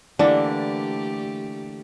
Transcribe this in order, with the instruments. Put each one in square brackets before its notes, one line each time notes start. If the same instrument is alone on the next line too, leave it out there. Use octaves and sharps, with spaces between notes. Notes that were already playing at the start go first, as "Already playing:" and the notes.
[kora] D3 E3 A#3 [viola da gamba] A3 G4 [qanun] D4 [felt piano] D5